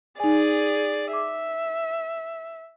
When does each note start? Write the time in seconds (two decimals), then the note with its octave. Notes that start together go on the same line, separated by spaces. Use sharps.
0.20 D#4 G#4 D5 G#5
1.13 E5 D6